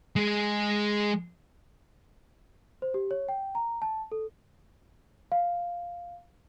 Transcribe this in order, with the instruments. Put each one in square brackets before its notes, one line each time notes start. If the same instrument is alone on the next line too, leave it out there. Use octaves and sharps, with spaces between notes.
[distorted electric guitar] G#3 G#4
[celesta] C5
G4
C#5
G5
A#5
A5
A4
F5